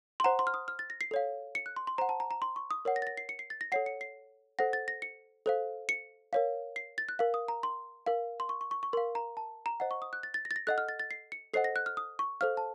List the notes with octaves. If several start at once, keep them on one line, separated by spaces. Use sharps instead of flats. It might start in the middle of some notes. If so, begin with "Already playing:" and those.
C6
C5 F#5 A#5
C6
F6
D#6
F6
A6
A#6
C7
A4 C#5 F5
C#7
F#6
C6
C6
C5 F#5 A#5
A5
A#5
A#5
C6
C#6
D#6
A#4 C#5 F#5
A#6
A6
A#6
C7
C#7
C7
A6
A#6
A4 C#5 F#5 C7
C#7
C7
A4 C5 F#5 A#6
A6
A#6
C#7
A4 C5 F5
C#7
A#4 C#5 F5
C7
A6
F#6
A#4 F5
D#6
A#5
C6
A#4 F5
C6
C#6
C#6
C#6
C#6
A#4 F5 C6
A#5
A5
A#5
C5 D#5 F#5
C#6
D#6
F#6
A6
A6
A#6
A6
A#6
A4 D#5 F#5 F#6
F6
A6
A6
C7
C#7
A4 C5 D#5 F#5 C7
A#6
F#6
F6
D#6
C#6
A4 C5 F5 F6
A5